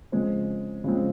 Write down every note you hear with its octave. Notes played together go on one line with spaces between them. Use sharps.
C#3 F3 G#3 C4 C5
C#3 F3 G#3 C4